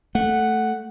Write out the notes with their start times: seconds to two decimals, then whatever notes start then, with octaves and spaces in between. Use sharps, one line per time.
0.15 A3 F#5